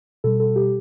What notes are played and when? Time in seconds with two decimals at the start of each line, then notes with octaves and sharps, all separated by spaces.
0.24 B2 G3 A4
0.40 A4
0.56 G4